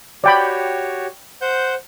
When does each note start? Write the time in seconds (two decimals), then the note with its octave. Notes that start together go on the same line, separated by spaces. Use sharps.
0.24 F#4 G4 C#5 D5 G5 B5
1.41 C5 F#5 G6